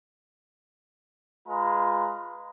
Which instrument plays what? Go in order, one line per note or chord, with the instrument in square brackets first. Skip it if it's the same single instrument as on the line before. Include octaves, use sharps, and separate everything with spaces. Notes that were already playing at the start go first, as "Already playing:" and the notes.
[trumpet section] G#3 F4 B4 A#5